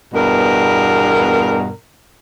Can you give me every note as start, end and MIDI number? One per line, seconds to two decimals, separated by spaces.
0.13 1.71 40
0.13 1.71 43
0.13 1.71 47
0.13 1.71 70